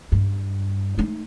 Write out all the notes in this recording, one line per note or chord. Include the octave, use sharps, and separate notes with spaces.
G2
A3 D#4